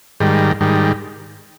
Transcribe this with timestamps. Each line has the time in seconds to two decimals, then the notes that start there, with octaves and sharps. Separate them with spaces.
0.20 G#2 D#3 G3
0.61 G#2 D#3 G3